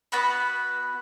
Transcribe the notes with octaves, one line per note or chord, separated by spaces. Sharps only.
B3 F#4 B5